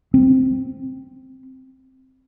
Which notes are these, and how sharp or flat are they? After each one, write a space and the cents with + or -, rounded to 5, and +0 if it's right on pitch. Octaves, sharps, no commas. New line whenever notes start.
C4 +0